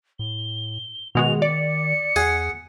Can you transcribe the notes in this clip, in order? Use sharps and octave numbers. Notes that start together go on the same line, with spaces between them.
A2 G7
B2 D#3 G#3 F#4 F7
D5 C#7
E2 G#4 F#5 G#5